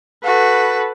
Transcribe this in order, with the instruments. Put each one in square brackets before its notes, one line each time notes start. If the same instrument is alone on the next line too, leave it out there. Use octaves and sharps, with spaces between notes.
[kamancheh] F#4 [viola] A4 B4